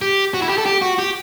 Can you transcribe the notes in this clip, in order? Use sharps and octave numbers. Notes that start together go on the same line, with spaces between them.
G4
F#4
E4
G4
A4
G4
F#4
G4